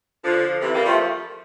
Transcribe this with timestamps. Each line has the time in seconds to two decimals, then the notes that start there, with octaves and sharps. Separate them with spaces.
0.23 D3 F3
0.61 C3 E3
0.74 G3 A#3
0.86 F3 A3